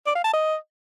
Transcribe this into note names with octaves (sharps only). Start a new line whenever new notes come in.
D5
F5
A5
D#5